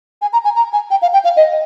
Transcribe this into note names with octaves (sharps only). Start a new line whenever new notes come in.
G#5
A#5
G#5
A#5
G#5
G5
F5
G5
F5
D#5